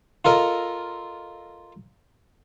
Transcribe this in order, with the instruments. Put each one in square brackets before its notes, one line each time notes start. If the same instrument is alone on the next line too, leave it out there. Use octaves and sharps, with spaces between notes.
[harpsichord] F4 A4 A#4 D#5